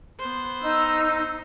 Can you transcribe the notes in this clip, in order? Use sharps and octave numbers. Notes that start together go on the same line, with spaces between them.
B3 C5
D#4 E6